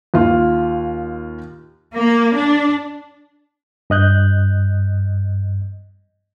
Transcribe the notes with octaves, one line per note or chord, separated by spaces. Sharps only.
D#2 F4
A#3
D4
G2 D#5 F#6 G6